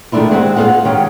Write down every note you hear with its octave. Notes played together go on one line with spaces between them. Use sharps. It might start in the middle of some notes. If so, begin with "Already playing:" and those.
D#3 G#3 A3 D4 E4 F4
G#3 C4 G4 C5 F#5
F4 G#4 A4 C5 F5 F#5
D#3 G#3 C#4 G4